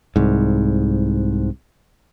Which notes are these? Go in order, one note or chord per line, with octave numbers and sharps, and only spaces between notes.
C2 G#2